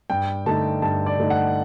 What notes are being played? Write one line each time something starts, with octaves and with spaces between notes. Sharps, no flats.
G2 G5
D3 A3 D#4 A5
G2 A5
D5
D3 A3 D#4
F#5